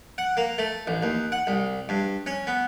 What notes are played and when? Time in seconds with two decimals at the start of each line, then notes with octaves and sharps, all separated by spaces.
0.18 F#5
0.37 A#3
0.58 A3
0.87 A1
1.03 D#2
1.32 F#5
1.47 C2
1.89 G2
2.26 C#4
2.47 B3